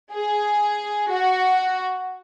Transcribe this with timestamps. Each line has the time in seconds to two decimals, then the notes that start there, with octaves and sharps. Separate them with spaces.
0.13 G#4
1.11 F#4